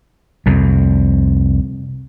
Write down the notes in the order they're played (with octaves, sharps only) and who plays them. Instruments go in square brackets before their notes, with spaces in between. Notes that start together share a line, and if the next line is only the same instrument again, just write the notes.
[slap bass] C2 F2